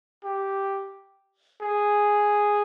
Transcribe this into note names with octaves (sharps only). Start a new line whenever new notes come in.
G4
G#4